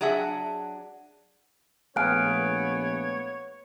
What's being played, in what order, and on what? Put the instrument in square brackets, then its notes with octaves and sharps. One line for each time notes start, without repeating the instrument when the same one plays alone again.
[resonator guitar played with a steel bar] F#3 D4 G#4 E5 F#5
[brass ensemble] A#1 B3 [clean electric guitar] A3 G#4 F5 [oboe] C#5 [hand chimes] F#6 D7